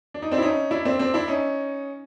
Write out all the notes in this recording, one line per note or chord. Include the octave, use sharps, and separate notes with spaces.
D4
D#4
C4 D4
E4
C#4 D#4
D4 E4
C4 D4
C4 D4
D4 E4
C#4 D#4